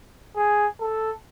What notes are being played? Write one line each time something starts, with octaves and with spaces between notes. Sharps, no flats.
G#4
A4